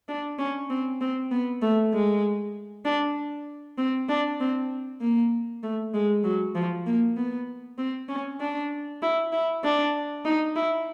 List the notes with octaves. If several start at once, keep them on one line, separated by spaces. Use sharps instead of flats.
D4
C#4
C4
C4
B3
A3
G#3
D4
C4
D4
C4
A#3
A3
G#3
F#3
F3
A#3
B3
C4
C#4
D4
E4
E4
D4
D#4
E4